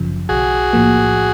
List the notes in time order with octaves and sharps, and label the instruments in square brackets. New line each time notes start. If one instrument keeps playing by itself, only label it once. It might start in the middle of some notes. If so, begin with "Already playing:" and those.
Already playing: [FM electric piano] G1 F#2 C#3 F3
[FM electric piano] B1 [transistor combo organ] F#4 G#4
[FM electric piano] A2 F3 A#3